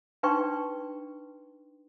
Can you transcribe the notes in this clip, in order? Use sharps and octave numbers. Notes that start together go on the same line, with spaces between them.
D4 D#4 B4 G5 C6 C#6